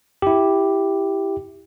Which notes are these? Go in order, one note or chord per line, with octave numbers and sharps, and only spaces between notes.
E4 G4